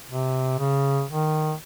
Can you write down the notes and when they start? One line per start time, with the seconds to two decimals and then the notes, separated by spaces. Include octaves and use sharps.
0.10 C3
0.59 C#3
1.09 D#3